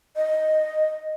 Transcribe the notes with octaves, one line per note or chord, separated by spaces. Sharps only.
D#5